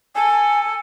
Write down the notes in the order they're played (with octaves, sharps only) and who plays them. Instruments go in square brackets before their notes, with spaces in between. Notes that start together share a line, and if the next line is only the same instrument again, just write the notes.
[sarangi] A4 [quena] G#5